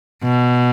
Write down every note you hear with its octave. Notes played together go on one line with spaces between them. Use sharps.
B2